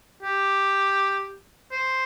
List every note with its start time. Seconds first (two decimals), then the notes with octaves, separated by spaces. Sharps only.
0.23 G4
1.72 C5